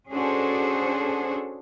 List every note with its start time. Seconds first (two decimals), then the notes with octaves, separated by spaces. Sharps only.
0.11 C#4 D4 F#4 G#4 A4 C5